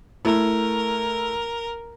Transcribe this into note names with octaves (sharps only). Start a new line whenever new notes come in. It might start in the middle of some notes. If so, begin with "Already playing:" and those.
A3 E4 A#4